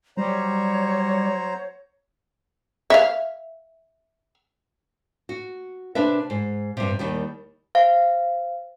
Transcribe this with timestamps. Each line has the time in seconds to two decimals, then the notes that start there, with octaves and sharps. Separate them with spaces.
0.17 F#3 G3 C5 C#5 A#5
2.90 E5 F5
5.29 F#4
5.95 C3 D4 B4 E5
6.30 G#2
6.77 G2 C3
6.99 D#2 D#3 G3
7.75 C5 F5